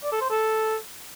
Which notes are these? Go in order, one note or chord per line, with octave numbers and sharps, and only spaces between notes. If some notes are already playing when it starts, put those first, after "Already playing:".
D5
A4
C5
A4